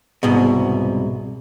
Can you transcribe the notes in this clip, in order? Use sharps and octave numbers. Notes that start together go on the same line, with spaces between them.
C2 G#2 B2